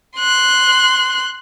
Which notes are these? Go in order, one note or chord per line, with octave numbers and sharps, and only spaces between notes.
C6 F#6